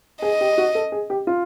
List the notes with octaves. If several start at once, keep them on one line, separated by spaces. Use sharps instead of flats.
G#4 D#5
G4
F#4
A4
G#4
G4
F4